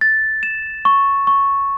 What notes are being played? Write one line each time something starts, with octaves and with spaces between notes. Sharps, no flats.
A6
E7
C#6
C#6